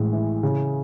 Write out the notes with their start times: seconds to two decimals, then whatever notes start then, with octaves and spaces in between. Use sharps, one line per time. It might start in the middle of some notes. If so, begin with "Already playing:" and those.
Already playing: A1 A2 G#3
0.13 E3
0.43 C#3